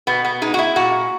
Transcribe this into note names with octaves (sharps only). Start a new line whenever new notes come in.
B2 B3
B3
G#3 D#4
F#4
E4
A#2 F#4